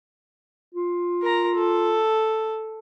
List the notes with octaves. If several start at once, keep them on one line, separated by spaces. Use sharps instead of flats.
F4
A#4 A#5
A4